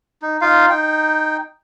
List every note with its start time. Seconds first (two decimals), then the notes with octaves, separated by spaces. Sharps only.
0.22 D#4
0.41 D#4 F4 F5
0.70 D#4 G5